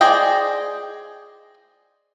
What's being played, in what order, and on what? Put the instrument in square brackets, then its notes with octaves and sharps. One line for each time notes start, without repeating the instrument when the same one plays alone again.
[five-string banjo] G#4 C5 D5 D#5 G5